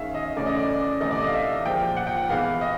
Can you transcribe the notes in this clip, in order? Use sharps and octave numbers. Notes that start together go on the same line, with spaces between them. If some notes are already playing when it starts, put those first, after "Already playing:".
Already playing: D#3 G#3 C#4 E5 F5
D#5
C#3 E3 A3 C#4 D5
D#5
D5
D5
C3 E3 A3 D#5
D5
D#5
F5
E5
A#2 F3 G#3 G5
F#5
G5
F#5
E3 G#3 B3 F5
D#5